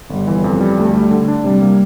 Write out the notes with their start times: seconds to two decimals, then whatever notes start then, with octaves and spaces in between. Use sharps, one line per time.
0.10 G1 G3
0.27 E3
0.44 F2
0.61 G3
0.77 D2 A3
0.94 G3
1.11 D3
1.28 D4
1.44 C3 G3
1.62 A#3